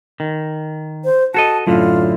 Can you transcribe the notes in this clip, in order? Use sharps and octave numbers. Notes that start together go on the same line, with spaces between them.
D#3
C5
F#4 A4 D#5 A5
F#2 A2 D3 F4